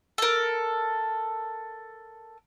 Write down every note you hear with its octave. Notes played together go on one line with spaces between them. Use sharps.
A4 A#4